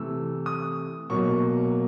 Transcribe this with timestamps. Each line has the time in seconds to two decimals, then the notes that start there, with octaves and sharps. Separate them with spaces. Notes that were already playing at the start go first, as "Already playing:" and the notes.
Already playing: C3 E3 A3 E6
0.46 D#6
1.10 B2 F#3 A#3 C#6